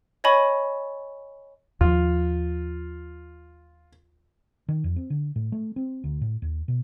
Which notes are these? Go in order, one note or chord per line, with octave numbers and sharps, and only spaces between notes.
C#5 D#5 G#5 B5 C#6
D#2 F3 F4
D#3
F2
C4
D3
A2
A3
C4
D2
A2
D#2
B2